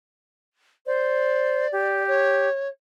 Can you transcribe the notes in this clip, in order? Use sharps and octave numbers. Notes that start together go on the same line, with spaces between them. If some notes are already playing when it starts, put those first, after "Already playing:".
C5 D5
G4
C#5